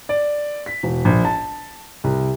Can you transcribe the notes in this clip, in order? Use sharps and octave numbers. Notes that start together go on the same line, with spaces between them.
D5
B6
E1
A#1
A5
C2